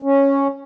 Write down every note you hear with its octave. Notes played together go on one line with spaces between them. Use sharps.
C#4